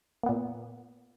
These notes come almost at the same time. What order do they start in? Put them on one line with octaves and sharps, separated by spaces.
A#3 B3 A#2